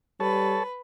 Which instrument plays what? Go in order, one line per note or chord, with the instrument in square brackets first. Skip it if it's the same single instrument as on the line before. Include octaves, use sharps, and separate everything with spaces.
[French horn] G3 [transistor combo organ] A4 C#5 A5 [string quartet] B4